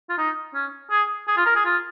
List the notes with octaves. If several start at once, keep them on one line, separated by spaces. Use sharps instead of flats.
F4
D#4
C#4
G#4
G#4
F4
A#4
G#4
F4